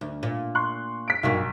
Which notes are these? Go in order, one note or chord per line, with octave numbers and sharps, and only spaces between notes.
D2
A#2
C6 C#6 F#6
B6 D7
B1 G2 A#3 F#4